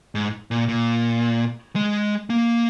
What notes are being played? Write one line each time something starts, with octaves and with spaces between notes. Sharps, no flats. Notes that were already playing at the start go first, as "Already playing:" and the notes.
G#2
A#2
A#2
G#3
A#3